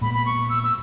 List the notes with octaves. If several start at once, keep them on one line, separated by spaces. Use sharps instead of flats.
A#2 G#3 B3 B5
B5
C#6
E6
E6